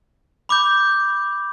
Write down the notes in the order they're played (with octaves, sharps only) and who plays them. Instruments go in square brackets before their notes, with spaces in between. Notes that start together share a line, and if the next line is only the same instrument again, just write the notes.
[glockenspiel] B5 D6 G6